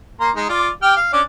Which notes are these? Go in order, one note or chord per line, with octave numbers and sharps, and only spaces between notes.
A#3 A#5 C6
G#3 D#4
F4 D5 D6
G4 G5 F6
F5
C#4 D4 D5